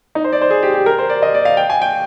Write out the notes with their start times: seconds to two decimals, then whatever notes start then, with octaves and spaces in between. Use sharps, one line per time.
0.15 D#4
0.24 C5
0.32 D5
0.42 C5
0.50 G#4
0.63 G4
0.74 G4
0.86 A#4
0.99 C5
1.09 D5
1.22 D#5
1.34 D5
1.45 F5
1.57 G5
1.70 G#5
1.82 G5